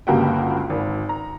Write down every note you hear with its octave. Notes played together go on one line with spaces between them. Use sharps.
G1 C#2 A#3 F#4 G4 G5
G#1
A#5